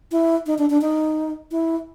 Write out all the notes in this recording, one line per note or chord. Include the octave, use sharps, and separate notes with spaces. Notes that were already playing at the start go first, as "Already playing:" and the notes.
E4
D#4
D4
D4
D#4
E4